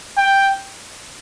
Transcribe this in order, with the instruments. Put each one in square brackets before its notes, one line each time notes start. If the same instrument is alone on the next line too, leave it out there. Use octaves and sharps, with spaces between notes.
[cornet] G5